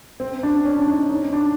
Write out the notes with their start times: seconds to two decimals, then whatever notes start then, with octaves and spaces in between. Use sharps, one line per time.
0.20 C4
0.43 D4
0.65 C#4
0.77 D4
0.88 D#4
1.09 D#4
1.33 D4